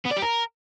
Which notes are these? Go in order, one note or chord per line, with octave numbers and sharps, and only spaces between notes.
B3
D5
G4
A#4